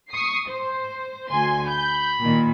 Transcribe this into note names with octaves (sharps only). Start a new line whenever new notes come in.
C#6 D#6 C7
C5
D2 G#5 C6
B5 G6
A#2 D#3